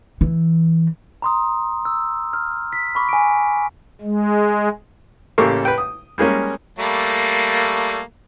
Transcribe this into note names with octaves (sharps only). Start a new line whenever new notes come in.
E3
A#5 C6 D#6
E6
F6
B6
B5 C#6 D6
G#5 D7
G#3
A1 C#3 A#3 G4 A4 C#6
B4 G5
D#6
G3 G#3 A#3 C#4
G3 A3 A#3